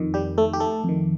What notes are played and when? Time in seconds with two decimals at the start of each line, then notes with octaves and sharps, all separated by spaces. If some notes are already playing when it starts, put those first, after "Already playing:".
Already playing: F2 D#3
0.14 G3 G4
0.38 A3 A4
0.53 G4
0.60 A3 A4
0.84 F2 D#3